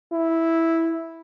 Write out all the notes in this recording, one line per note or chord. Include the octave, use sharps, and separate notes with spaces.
E4